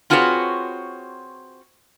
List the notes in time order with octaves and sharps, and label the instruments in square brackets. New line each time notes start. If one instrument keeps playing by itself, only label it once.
[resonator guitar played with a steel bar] C4 F4 F#4 G#4 B4 C#5